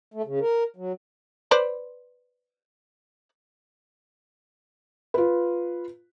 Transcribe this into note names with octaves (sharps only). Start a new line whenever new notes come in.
A3
C#3
A#4
F#3
B4 C5 D5
F4 B4